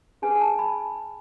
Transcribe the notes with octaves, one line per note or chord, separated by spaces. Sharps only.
D4 G#4 B4 G#5
A5
B5